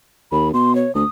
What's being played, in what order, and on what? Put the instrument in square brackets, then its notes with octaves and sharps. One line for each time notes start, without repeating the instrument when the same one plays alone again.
[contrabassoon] D#2 [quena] B5
[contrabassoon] B2 [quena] C6
[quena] C#5
[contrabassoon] D2 [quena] D#6